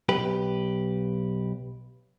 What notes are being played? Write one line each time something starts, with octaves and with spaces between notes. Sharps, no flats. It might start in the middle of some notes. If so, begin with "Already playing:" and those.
B1 G4 B4